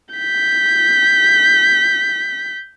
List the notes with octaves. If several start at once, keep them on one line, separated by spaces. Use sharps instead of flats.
G6 B6